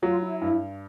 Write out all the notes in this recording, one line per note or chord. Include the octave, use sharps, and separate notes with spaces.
F#3 F4
E4
G2 E4